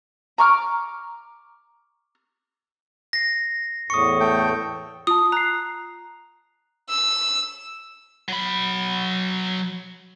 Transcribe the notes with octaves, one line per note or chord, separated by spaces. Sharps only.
A#5 C#6 D6 F6
A#6 C7
E2 A2 C#6 D#6 C#7
A3 G5
F4 A5 D#6
A#5 F#6 C7
E6
F#3 B5